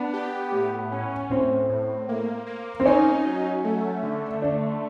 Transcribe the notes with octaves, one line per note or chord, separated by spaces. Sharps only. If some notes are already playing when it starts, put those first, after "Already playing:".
Already playing: B3 D4
G4
A2
C#4
A2 C4
A2
A#3
A#3
C4
C#4 D#4
F#3
A3
D3
A3 D4